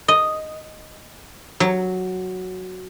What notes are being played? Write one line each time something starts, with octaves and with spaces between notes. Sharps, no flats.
D#5
F#3